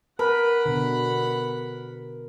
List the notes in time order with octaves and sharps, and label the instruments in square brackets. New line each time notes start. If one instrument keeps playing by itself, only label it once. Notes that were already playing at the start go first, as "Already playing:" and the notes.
[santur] A#4 [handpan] B4 [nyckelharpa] F#5 B5
[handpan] B2 D3